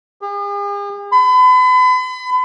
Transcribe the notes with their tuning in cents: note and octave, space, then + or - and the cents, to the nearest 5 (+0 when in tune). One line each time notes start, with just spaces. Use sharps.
G#4 -45
B5 +40